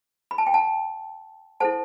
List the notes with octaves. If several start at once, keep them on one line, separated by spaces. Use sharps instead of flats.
B5
A5
G5
F#5 A5
E4 A4 C5 F#5 A5